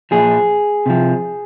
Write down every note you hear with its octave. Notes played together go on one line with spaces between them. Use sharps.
A#2 F3 G#4
C3 F3